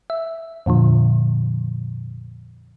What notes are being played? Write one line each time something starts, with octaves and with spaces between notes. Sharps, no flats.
E5
F2 A#2 D3 F3